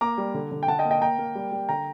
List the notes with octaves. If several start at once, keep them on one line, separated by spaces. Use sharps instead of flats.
A#3 A#5 D6
G3
D3
D3
G5
D3 F#5 A5
D#5 G5
A#3
D#5 G5
A#3 G5 A#5
A#3
G3
G3
D3 G5 A#5